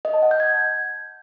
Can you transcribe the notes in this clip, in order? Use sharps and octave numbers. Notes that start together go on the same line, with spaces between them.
D#5
A5
F#5
G6
G#6